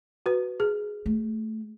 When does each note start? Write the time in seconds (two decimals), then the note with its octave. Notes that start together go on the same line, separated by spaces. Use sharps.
0.26 F#4 B4
0.60 G#4
1.06 A3